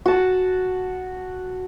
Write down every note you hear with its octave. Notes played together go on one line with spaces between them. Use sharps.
F#4 A5